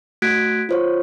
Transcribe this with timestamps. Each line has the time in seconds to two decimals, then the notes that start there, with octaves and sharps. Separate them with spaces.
0.22 A3 F#4 F#6 G#6 B6 D7
0.69 F4 C5 C#5